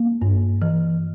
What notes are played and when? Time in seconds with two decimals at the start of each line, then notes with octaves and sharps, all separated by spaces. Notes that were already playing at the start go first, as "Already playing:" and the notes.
Already playing: A#3
0.22 G2
0.62 E3